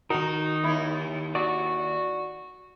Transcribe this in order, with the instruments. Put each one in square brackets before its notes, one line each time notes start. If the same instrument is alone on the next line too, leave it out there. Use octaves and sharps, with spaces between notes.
[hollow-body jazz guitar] D#3 A#4 [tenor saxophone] D#4 [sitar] F#4
[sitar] D#2 E4
[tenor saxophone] F#4 [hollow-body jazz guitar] D5